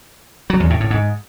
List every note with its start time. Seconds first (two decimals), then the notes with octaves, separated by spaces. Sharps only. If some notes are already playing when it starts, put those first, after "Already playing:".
0.50 F#3
0.60 E2
0.70 A2
0.80 A2
0.90 G#2